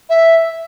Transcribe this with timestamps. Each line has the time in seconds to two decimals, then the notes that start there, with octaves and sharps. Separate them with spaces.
0.10 E5